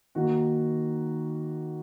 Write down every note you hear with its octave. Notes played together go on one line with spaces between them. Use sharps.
D#3 A#3 D#4 F#4